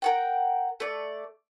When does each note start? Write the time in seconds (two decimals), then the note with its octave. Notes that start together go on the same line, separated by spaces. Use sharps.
0.02 A#4 F#5 G5
0.80 A3 D5